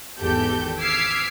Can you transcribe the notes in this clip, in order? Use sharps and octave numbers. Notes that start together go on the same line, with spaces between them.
G#1 E2 G4 A4 G6
D6 E6 F6 G#6 B6 C7